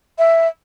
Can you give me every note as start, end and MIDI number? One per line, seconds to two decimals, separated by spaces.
0.18 0.48 76